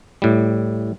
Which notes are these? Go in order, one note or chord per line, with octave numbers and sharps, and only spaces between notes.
A2 G3